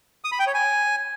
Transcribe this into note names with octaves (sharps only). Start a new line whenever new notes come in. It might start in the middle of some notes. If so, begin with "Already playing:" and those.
D#6
B5
G5
C#5
G#5